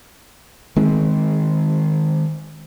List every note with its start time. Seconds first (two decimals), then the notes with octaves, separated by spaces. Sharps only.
0.76 D#3 G#3 C4